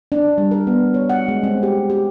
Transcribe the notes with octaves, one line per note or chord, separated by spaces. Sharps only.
D4
G3
A#4
B3
C#5
F#5
G#3
C4
G4
G4